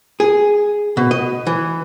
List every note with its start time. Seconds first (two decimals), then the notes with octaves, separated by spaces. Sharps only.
0.20 G#4
0.97 B2
1.11 D#5
1.47 E3